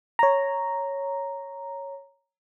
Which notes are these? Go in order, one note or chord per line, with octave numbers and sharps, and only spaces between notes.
C#5 A#5